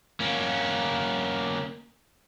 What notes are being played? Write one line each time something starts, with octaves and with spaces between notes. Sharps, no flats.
A#3 C#4